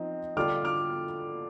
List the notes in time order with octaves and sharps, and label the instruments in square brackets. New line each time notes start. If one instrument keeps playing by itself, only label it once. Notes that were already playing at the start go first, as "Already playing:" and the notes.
Already playing: [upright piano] F3 C4 D#4
[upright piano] D3 G3 D4 F4 [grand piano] D6 F6
[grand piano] D6 F6